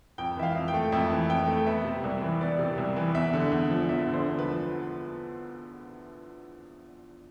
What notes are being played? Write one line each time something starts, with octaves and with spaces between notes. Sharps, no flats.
F2 G5
E3 E5
F5
F2
G5
A3
F2 E5
E3
F2 G5
A3
B3 E5
C3
C2
E3
B3 D5
C3
C2
E3
E2 E5
D3
E2
F3
E2 E5
D3
C5
E2
B4
F3